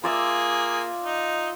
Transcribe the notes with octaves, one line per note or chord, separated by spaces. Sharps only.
A#3 F4 G#4 D5 E5
D#4